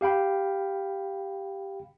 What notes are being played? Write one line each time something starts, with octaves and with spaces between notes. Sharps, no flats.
G4 F5 G5 B5